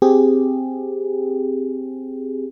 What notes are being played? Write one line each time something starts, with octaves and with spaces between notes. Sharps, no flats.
C4 G4 G#4